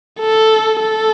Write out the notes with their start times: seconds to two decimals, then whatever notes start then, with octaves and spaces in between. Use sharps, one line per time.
0.20 A4
0.81 A4